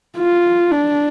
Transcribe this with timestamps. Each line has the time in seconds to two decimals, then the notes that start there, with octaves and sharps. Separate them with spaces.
0.18 F4
0.71 D4